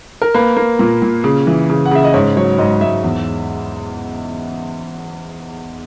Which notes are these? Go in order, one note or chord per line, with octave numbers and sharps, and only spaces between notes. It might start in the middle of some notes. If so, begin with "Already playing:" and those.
A#4
A#3 B4
A#3
A#2
A#2
C#3
E3
C#3
F#5
C#3 E5
D#5
G#2 C#5
F#3 C#5
G#2 D#5
G#2 E5
E2